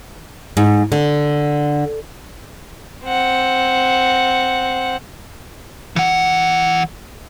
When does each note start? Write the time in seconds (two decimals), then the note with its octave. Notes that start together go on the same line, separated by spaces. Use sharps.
0.57 G#2
0.92 D3
3.05 C4 F#5
5.96 E3 F#5